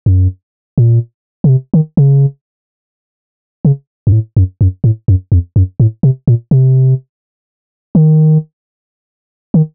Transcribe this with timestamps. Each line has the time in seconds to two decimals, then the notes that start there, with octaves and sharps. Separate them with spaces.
0.06 F#2
0.78 A#2
1.44 C#3
1.49 C3
1.74 D#3
1.97 C#3
3.65 C#3
4.07 F#2
4.12 A2
4.37 F#2
4.61 F#2
4.84 A2
5.08 F#2
5.32 F2
5.56 F#2
5.80 A2
6.03 C3
6.28 A#2
6.51 C3
7.95 D#3
9.54 D#3